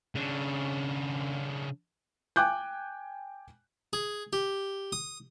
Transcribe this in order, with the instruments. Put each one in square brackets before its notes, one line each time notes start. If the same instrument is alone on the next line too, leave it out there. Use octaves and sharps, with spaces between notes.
[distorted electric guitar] C#3 D4
[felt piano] G5 G#5 D6 F#6 G6
[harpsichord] G#4
G4
D#6